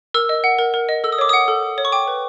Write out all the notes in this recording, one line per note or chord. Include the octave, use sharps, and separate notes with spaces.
A#4 E6
D#5
F#5
A#4
A#4
D#5
A4 E6
D#6
C#5 D6
F#5 D#6
A4
A4
C#5
C#6
G5 D6
B4